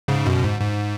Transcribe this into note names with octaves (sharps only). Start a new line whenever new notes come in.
G#2 C#3
F#2 B2
G#2
G#2